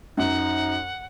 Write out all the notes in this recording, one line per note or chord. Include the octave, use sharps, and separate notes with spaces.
F#2 D#4 F#5